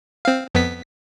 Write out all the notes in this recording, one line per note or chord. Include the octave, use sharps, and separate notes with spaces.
C4 F5
F2 B3 B6